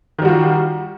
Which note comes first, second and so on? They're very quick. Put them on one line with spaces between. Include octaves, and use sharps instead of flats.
D#3 G3 F#4 F4